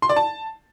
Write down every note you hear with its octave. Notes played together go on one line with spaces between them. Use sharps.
C6
D5
A5